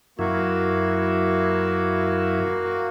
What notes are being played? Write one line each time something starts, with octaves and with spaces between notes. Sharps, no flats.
F#2 A#3 E4 F#4